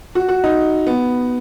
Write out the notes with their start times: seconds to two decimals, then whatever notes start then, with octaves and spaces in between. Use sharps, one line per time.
0.15 F#4
0.29 F#4
0.44 D#4
0.87 B3